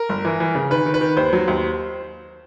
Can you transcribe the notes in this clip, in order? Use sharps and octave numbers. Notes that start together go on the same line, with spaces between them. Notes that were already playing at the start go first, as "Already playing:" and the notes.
Already playing: A#4
G1
E3
E3
C#3
D#3 B4
D#3
B4
D#3
D#2 C5
F#3
D#2